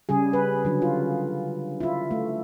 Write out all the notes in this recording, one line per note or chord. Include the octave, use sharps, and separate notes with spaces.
C#3 G3 G#4
B4
D3 F#3
F4
E4 F4
A3